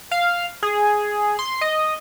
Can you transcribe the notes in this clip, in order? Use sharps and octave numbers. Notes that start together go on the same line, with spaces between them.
F5
G#4
C6
D#5